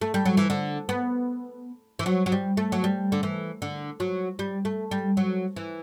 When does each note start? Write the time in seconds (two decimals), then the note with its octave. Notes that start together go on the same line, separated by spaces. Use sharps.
0.01 A3
0.14 G3
0.25 F#3
0.37 E3
0.50 D3
0.89 B3
1.99 E3
2.06 F#3
2.26 F#3
2.32 G3
2.57 A3
2.72 F#3
2.84 G3
3.12 D3
3.23 E3
3.62 D3
4.00 F#3
4.39 G3
4.65 A3
4.91 G3
5.17 F#3
5.56 E3